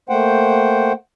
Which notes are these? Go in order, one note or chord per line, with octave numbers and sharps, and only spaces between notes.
A3 A#3 C5 F#5 G5